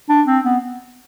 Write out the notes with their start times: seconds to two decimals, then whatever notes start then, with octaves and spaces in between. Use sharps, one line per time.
0.09 D4
0.27 C4
0.45 B3